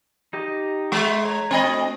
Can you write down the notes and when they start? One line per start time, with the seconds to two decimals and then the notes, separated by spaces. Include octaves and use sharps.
0.33 D#4 G4 D#5
0.92 G#3 E5 C6 C#6
1.25 C#5 A#5
1.51 C4 C#5 D#5 B5
1.64 A3 D4 F#4